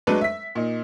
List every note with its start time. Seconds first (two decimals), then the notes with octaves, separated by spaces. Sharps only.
0.07 F#3 G#3 A3 D4 A4 B4
0.21 E5 B6
0.55 A#2 D#4